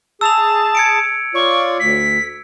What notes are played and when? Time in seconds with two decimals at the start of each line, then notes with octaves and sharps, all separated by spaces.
0.21 G#4 A5 E6 F7
0.75 G#6 C#7 D7
1.35 F4 C#5 D5 C#6
1.80 D2 B6